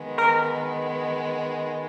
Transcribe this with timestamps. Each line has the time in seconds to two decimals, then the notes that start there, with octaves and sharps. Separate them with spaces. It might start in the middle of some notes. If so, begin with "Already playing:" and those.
Already playing: D#3 G#3 B3
0.18 A#4